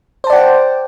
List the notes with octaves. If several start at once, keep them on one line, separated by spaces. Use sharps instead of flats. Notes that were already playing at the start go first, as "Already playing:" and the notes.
C5 D5 F#5 G5 A5